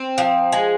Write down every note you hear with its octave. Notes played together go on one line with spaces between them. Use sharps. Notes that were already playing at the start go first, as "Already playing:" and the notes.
Already playing: C4
F3
G#3